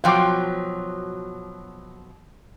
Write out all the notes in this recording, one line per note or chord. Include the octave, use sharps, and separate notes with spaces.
B2 F3 F#3 F5 G5 D6